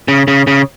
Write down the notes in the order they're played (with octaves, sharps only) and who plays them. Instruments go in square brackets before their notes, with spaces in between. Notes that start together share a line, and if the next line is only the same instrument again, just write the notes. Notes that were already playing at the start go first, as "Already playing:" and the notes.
[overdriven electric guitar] C#3
C#3
C#3